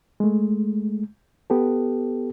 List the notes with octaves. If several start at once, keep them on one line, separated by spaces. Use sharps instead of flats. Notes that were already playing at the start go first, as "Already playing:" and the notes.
G#3 A3
B3 G4 A4